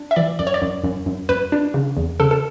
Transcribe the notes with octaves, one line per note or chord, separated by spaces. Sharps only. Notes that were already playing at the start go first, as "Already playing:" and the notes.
Already playing: D4
E5
E3 D5
F#2 D5
C#5
D5
F#2
F#2
F#2
F#2 B4
D4
C#3
E2
C#3 A4
A4